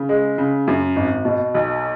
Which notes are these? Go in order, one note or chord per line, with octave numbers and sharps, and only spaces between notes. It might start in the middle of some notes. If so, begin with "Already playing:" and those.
Already playing: C#3
G#3
C#3
F#2
G#1
B2
B1